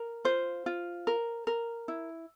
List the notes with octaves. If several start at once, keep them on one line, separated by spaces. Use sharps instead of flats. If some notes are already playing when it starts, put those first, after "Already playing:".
Already playing: A#4
F4 C5
F4
A#4
A#4
E4